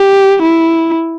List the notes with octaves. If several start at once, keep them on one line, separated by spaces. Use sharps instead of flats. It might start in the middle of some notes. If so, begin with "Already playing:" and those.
Already playing: G4
E4